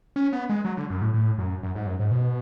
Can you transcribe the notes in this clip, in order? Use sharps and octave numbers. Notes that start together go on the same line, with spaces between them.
C#4
B3
G#3
F#3
D3
F#2
A2
A2
F#2
F#2
G#2
F#2
G#2
B2